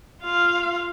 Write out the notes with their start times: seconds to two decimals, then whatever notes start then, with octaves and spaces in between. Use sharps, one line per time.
0.23 F4 F5